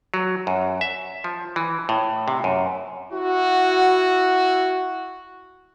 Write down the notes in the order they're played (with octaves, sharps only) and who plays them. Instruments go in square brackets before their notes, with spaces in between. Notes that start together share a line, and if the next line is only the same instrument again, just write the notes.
[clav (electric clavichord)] F#3
F#2
E5
F3
E3
A2
C3
F#2
[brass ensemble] E4 F#4